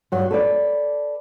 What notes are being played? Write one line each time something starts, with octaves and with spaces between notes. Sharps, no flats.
G2 F#3 G3
A4 B4 D5